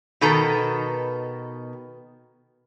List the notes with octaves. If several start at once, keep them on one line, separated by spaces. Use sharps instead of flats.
B2 D#3 B3 A4 B4 A#5